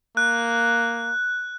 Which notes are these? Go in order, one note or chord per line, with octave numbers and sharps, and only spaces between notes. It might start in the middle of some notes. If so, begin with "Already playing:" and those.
A#3 F#6